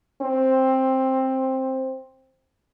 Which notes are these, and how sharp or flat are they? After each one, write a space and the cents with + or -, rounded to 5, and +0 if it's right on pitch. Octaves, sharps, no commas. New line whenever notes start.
C4 +10